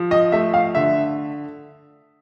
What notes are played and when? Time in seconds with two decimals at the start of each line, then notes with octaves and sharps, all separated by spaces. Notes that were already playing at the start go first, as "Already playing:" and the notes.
Already playing: F3
0.11 D#5
0.32 A3 E5
0.54 F5
0.75 D3 E5